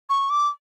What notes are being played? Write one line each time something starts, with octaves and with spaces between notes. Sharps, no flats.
C#6
D6